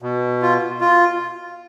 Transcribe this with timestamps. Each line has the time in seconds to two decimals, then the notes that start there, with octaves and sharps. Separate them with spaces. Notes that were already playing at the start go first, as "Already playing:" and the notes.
0.02 B2
0.42 F4
0.81 F4